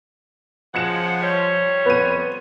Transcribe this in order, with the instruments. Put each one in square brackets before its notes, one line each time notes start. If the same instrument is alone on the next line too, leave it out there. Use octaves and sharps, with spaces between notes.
[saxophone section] C#3 G#3 F#5 [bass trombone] F3 [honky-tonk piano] G#6 C#7 E7
[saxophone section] G3 C5 C#5
[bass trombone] F2 [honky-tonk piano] B3 D#7